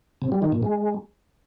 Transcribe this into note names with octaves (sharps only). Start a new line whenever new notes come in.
C3
G3
D#3
A#2
G#3